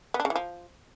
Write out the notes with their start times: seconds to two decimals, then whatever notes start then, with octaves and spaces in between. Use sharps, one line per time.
0.14 B3
0.20 D4
0.25 C#3
0.30 E3
0.36 F3